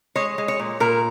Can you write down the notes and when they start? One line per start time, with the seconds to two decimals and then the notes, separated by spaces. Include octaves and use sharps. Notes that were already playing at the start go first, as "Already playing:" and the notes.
0.16 G#3 C#5
0.38 G#3
0.48 C#5
0.59 A#2
0.80 A#2 A#4